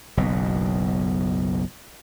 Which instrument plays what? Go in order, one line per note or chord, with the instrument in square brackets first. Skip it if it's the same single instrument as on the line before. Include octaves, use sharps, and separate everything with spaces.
[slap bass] F#1 B1 B2